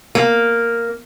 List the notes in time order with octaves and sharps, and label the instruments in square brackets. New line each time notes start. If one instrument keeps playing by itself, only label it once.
[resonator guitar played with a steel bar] A#3